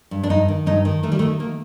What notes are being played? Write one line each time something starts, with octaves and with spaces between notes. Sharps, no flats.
G2
D4
G2 D#4
D#3
G2 D#4
D#3
D#3 A3
G3
A3
D#3
D#3 A#3